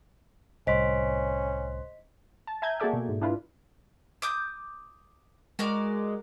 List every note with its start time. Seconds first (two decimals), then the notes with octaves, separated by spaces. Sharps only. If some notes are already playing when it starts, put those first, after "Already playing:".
0.67 C2 A2 C#4 C5 D#5 C6 B6
2.47 A5
2.62 E5 G#5 A#5 G6 G#6
2.80 A#3 F#4 G#4 A4 D5 E5
2.93 B2
3.09 G#2
3.22 D4 E4 F4 B4
4.22 D6 D#6 G6
5.59 G#3 F#4 A#4 D5